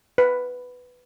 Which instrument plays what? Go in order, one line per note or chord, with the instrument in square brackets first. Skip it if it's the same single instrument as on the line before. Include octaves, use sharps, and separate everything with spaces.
[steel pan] B4